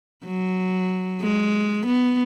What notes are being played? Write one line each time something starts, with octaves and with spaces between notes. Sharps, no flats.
F#3
G#3
B3